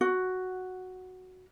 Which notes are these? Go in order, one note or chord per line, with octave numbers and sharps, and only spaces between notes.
F#4